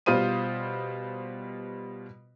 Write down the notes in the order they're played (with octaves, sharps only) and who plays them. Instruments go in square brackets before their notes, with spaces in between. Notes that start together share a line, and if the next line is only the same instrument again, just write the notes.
[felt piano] B2 G3 F4 C5 D#6 D#7